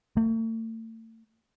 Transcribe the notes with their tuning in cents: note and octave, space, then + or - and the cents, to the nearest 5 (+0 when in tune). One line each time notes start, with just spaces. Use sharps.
A3 +40